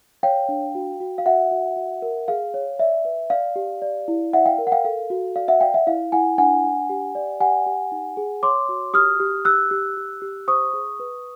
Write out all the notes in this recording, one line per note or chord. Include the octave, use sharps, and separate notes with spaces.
C#5 F5 G5
D4
F#4
F#4
F5
F#4 E5 F#5
F#4
F#4
A#4
G#4 F5
C#5
D5 E5
B4
D5 F5
G4
D5
E4
D5 E5 F#5
F5 G5
A#4
F#5
F5 G5
A4 F5
F#4
D5 F5
E5 F#5
D5 F5 G5
E5 F#5
E4 F5
E4 F#5 G#5
D4 F#5 G#5
D4
G4
D5
G4 F#5 G#5
G4
D#4
G#4
C#5 C6 D6
F#4
G4 D#6 F6
G4
G4 E6 F#6
G4
G4
G4
C5 C#6 D#6
G#4
B4